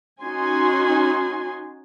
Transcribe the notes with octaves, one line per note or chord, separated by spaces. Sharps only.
C#4 D#4 F#4 G#5 C6